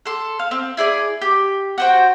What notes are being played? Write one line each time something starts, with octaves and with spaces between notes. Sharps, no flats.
A4 C6
F5
C4
E4 G#4 D5 G#5
G4
F#4 C5 G5